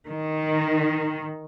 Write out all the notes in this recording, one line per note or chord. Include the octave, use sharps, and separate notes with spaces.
D#3